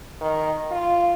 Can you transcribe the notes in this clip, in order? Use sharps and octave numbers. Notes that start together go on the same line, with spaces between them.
D#3
F4